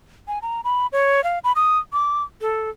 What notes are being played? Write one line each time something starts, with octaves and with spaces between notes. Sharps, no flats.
G#5
A#5
B5
C#5
F5
B5
D#6
D6
A4